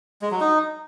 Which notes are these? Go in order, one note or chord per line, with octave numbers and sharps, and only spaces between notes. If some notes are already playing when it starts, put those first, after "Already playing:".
G#3
F#3
D#4